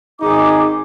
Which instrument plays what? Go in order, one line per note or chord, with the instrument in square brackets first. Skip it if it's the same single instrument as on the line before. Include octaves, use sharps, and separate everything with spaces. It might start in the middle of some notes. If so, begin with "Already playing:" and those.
[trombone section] G#1 D#4 [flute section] G#4 D6